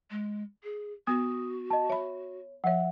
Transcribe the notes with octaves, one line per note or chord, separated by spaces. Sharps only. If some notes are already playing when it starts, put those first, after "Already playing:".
G#3
G#4
B3 F#4 D#6
D#5 A5
C#5 E5 B5
F3 C#5 E5 F#5